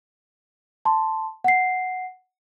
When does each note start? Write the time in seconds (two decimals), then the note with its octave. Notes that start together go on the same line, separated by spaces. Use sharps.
0.85 A5 C6
1.44 F#5 C7